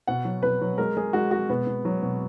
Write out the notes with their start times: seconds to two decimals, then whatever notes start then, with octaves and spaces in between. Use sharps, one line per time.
0.07 B2 F#5
0.25 F#3
0.43 B2 B4
0.61 F#3
0.78 G#3 A#4
0.97 G#3 G#4
1.13 G#3 F#4
1.31 G#3 F#4
1.49 B2 B3
1.67 B2
1.85 F#3
2.02 B2